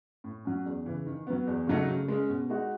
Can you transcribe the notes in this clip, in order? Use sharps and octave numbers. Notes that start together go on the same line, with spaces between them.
A2
F#3 C#4
E2
C#3 E3
D#3
F#3 B3
E2
C#3 F#3 A3 D#4
C#3
G#3 C#4
B2
G#3 D#4 F#4